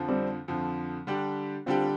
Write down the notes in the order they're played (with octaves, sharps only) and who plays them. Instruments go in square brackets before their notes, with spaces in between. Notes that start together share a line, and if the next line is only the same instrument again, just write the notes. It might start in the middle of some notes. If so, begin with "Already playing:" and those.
Already playing: [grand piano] F2 D3 F3
[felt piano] G3 C4
[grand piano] F2 D3 F3
D3 G3 D4 G4
[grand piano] D3 G3 D4 G4 [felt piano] C4 F4